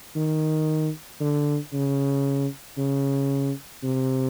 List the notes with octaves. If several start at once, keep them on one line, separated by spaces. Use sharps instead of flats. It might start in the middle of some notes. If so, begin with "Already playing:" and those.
D#3
D3
C#3
C#3
C3